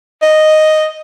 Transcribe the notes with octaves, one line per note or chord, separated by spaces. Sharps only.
D#5